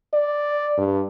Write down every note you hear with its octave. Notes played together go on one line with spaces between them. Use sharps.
D5
G2